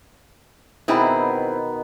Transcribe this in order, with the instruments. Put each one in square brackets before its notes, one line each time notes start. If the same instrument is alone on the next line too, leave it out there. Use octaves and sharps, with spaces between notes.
[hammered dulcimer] B2 D#3 B3 [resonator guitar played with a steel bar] C4 E4 G#4